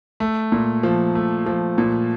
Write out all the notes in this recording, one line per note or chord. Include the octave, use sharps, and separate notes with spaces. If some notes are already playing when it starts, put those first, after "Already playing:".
A3
A#2
F3
A3
F3
A#2